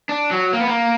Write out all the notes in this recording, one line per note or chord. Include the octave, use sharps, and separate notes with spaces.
D4
F#3
A#3
B3
A#3